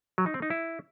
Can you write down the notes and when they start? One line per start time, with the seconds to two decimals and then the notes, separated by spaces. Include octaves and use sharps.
0.18 F#3
0.26 D#4
0.34 C4
0.42 D#4
0.50 E4